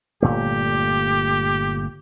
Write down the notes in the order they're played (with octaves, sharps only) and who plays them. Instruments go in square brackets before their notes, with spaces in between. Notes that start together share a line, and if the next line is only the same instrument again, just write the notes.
[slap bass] G1 A#2 A3 [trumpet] G4